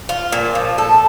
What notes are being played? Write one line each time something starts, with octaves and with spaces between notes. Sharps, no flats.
F4
A#2
F3
A4